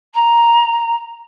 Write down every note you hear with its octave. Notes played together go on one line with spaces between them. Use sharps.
A#5